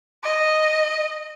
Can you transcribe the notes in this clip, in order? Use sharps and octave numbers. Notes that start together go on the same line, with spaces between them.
D#5